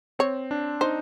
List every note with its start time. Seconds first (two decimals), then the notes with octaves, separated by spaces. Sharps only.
0.19 C4 C#5
0.51 D4
0.81 D#4 C5